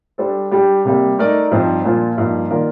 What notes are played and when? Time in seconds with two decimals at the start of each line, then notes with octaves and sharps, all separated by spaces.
0.18 G3 D4 A4 C5
0.51 G3 D4 G4 D5
0.85 C3 G3 A#3
1.18 A3 D#4 A#4 D5
1.51 G2 F3 C4 D#4
1.84 A#2 F3 A#3 D4 F4
2.18 G2 F3 A#3 D#4
2.50 D#3 A#3 F4 A#4 D5